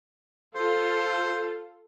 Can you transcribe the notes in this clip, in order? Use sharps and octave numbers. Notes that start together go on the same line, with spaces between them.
F4 A4 C5